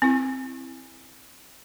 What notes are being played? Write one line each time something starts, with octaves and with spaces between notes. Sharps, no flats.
C4 E4